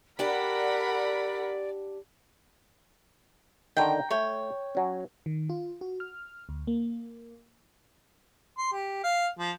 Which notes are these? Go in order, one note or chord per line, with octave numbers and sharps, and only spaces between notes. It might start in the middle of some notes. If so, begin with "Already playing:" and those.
D4 G4 A#4 D5 F#5 B5
D3 D#3 G5 A#5
A3 C#5 G5
F#3 C#4
D#3
F4
F#4
F6
D2
A#3
C6
G4
F5
F3